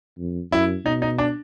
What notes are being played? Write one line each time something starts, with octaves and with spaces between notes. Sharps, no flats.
F2
F#2 E4
B2 D#4
D#4
D4